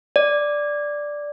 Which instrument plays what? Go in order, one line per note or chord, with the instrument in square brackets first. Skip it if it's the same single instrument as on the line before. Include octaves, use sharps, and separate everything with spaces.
[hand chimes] D5